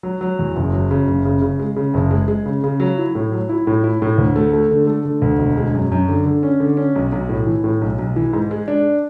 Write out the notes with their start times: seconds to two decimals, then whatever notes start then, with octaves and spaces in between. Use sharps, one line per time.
0.03 F#3
0.21 F#3
0.39 E2
0.56 F#1
0.73 F#3
0.91 C#3
1.08 F#1
1.25 C#3
1.41 C#3
1.59 G#3
1.76 C#3
1.94 F#1
2.11 G#3
2.28 G#3
2.46 C#3
2.64 C#3
2.80 F#3
2.98 E4
3.15 A2
3.32 F#3
3.49 E4
3.67 A2
3.84 E4
4.02 A2
4.18 D2
4.36 A3
4.53 A3
4.71 D3
4.87 A3
5.05 D3
5.22 D2
5.39 E1
5.57 G#3
5.73 F#2
5.92 F#2
6.08 D3
6.26 D3
6.43 C#4
6.60 D3
6.77 C#4
6.95 B1
7.12 B1
7.29 A2
7.47 E3
7.64 A2
7.82 B1
7.99 B1
8.16 E3
8.33 G#2
8.51 G#3
8.68 D4